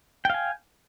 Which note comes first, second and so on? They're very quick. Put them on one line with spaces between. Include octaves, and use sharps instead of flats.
G5 F5 G#5